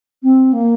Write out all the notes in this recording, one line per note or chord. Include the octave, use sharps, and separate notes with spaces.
C4
A#3